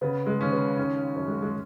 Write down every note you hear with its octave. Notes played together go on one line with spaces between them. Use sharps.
C#3 B3
G#3
D#2 C#4
B3
D#3 C#4
F#2
G#3
G#3